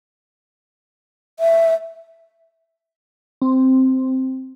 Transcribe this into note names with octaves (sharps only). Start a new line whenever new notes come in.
E5
C4